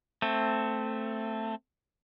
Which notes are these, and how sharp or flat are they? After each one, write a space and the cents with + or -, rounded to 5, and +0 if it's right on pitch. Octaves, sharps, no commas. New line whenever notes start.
A3 +10 C4 +0